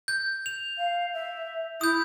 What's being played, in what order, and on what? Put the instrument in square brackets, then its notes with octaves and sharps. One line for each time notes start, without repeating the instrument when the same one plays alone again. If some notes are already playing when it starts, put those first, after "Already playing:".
[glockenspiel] G6
F7
[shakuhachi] F5
E5
[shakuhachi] E4 [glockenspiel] D#6 G6